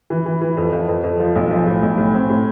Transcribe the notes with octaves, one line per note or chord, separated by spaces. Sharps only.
E3
E3
E3
F2
F2
F2
F2
F3
B1
F3
A2
B1
A2
C4
A2